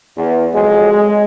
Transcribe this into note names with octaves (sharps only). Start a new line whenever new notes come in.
E2
F2 F#3 G#3
G#3